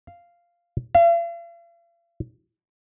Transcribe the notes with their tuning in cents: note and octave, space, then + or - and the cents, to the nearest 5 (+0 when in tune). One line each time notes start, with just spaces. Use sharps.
F5 -10
F5 -45